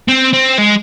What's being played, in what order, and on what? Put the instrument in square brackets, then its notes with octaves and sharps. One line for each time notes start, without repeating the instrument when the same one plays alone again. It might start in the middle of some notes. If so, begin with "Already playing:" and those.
[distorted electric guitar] C4
C4
G#3